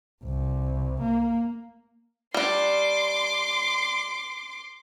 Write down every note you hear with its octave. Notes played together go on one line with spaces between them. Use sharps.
C2
A#3
G3 D4 C6 D6